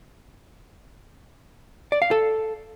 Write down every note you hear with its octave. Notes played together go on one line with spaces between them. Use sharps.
D5
F5
A4